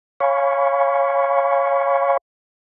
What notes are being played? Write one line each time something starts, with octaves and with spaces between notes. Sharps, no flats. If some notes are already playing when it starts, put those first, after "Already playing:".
C#5 F5 G#5 B5 C#6